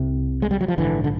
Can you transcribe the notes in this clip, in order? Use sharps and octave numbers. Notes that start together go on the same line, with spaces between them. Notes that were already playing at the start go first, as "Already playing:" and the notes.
Already playing: C2 C3
G#3
G3
F#3
F3
A#1 G#2 D3 E3
D3